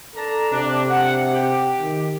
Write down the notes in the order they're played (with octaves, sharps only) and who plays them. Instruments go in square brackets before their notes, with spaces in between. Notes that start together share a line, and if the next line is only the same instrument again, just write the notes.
[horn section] D4 A5 A#5 [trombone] A4
[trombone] C3 [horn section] D4
[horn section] F#5
G4
[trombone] D#3